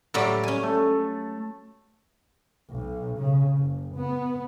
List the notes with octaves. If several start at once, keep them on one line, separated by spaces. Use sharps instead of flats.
A2 F#3 G3
C#4 G#5
A3
B1
C#3
F#1
B3